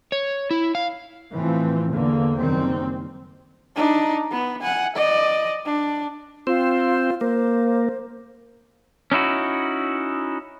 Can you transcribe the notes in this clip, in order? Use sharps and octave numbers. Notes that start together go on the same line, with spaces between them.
C#5
E4
F5
A2 E3 F3 C4
E2 D3 A#3
F#1 D#3 G3 C4
D4 D#4
B3
F#5 G#5
D5 D#5
D4
C4 F4 C5
A#3 C5
C#4 D#4 E4 F#4